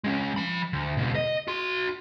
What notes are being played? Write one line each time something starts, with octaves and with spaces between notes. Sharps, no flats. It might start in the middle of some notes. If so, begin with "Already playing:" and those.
G#3 C#4
F3 B5
D2
C#2 B2
D#5
F#4 C6